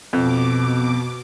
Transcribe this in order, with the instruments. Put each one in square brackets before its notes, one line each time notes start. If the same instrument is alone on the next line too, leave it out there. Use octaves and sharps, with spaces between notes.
[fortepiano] F2 [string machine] B2 D6